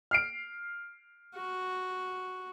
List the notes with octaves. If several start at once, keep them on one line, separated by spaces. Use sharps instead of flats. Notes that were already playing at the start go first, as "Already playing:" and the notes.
F6 C7 D7
F#4